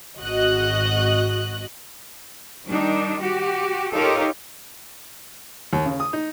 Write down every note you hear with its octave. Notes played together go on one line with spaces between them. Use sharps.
G#1 F#4 D#5 F#6
D#3 G3 D4 D#4
F#4 G4
D#4 F4 G4 A4 A#4 C#5
D#2
C#3
D#6
D#4